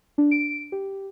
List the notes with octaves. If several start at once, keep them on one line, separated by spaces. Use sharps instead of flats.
D4
D7
G4